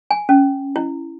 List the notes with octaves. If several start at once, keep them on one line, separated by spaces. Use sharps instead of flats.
G#5
C#4
E4